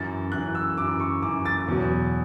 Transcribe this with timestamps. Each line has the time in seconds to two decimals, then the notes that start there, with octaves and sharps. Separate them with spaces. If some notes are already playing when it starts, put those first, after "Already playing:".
Already playing: F#2 E3 A6
0.32 F#2 E3 F#6
0.55 E6
0.78 F#2 E3 D6
1.00 C#6
1.22 F#2 E3 D6
1.45 A6
1.68 E2 B2 F#3